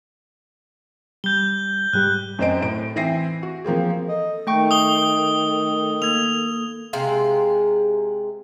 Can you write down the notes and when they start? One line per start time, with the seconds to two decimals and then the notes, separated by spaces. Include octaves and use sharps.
1.24 G3 G6 G7
1.93 G#2 G3 G4 F#6
2.39 F#2 C4 C5 D#5 D7
2.61 A2 D7
2.96 E3 C4 E5 A#6 C7 D#7
3.43 F#4
3.64 F3 A#3 C4 G#4
4.08 A4 D#5
4.47 D#3 A3 G5 C#6
4.71 D#6 G7
6.02 A#3 G#6 F7
6.93 C3 G#3 G#4 F5